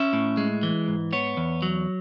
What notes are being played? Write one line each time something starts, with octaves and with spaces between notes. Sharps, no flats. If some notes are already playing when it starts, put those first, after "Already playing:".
Already playing: C#4 E5
A2
G#3
E3
G#2
B3 C#5
E2
F#3